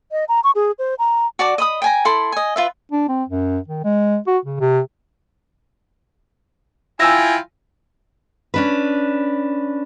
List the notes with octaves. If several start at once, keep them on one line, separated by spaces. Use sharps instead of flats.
D#5
A#5
C#6
G#4
C5
A#5
F#4 D5 A5 D6
D#5 B5 D#6
G5 G#5 A#5
E4 A4 B5 C6
D#5 G#5
F4 B4 E5
D4
C4
F#2
D#3
G#3
F#4
C#3
C3
E4 F4 G5 G#5 E6 A#6
C#4 D4 B4